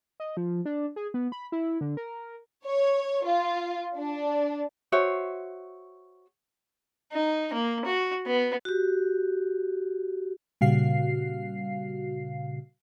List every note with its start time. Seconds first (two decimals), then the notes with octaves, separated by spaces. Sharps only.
0.20 D#5
0.37 F3
0.66 D4
0.96 G#4
1.14 B3
1.32 B5
1.52 E4
1.81 D3
1.97 A#4
2.65 C#5
3.25 F4
3.97 D4
4.92 F#4 C5 C#5 E5
7.12 D#4
7.53 A#3
7.85 F#4
8.26 B3
8.65 F#4 G4
10.61 A#2 C#3 G3 F#4 F5 C7